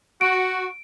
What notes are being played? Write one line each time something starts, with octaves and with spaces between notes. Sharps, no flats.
F#4 D7